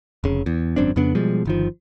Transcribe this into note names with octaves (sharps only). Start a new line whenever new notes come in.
F1 C#3
E2
G#1 F#2 C4 D4
F2 C#3 B3 D4
B2 F3 G3 G#3
G1 D#3 F3